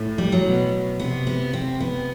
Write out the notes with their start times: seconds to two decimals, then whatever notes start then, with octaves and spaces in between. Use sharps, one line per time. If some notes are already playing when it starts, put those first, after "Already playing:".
Already playing: A2
0.18 G3
0.32 F#3
0.45 B2
0.99 C3 B3
1.27 B3
1.53 C4
1.80 B3